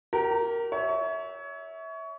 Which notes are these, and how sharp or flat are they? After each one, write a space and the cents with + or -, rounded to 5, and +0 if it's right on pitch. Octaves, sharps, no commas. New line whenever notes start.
G4 -35 A#4 +0
C#5 +25 E5 -20